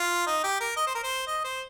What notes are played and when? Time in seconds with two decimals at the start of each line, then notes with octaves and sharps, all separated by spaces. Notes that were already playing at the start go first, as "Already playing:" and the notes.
Already playing: F4
0.27 D#4
0.44 G4
0.61 A#4
0.77 D#5
0.87 C5
0.95 A#4
1.04 C5
1.27 D#5
1.44 C5